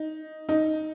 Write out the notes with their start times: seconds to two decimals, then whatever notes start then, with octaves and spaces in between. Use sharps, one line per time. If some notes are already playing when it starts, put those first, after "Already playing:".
Already playing: D#4
0.49 D#4